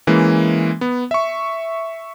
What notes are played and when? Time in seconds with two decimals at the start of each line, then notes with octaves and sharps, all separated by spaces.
0.07 E3 G#3 A#3 C#4
0.81 B3
1.11 E5 C#6